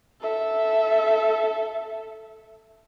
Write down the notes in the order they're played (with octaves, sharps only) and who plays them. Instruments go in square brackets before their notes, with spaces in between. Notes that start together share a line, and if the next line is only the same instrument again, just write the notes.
[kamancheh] A4 E5